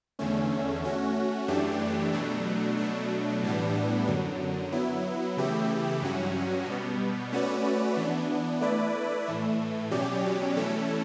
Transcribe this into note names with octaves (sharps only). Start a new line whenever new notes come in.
E2 D3 A3 C#4
A3 C#4 F#4
F#2 E3 A3 D4 G4
B2 F#3 A3 D4
B2 F#3 A3 D4
A2 E3 G3 B3 D4
F#2 D3 F#3
F#3 B3 E4
C#3 E3 A3 E4 G4
G2 F#3 C#4 F#4
B2 G3 B3
A3 C#4 F#4 B4 D5
E3 B3 D4
A3 E4 B4 D5
A2 E3 A3
B2 F#3 C#4 G4 D5
E3 A3 C#4 E4 A4